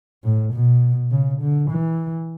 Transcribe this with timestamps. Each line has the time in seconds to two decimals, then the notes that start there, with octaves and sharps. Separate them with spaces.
0.24 A2
0.53 B2
1.11 C#3
1.41 D3
1.70 E3